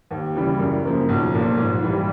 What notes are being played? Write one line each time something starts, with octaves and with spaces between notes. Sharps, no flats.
D#2
C#3 E3 G3
F#2
C#3 F3 A#3
B1
A#2 F3
G#2
E3 G3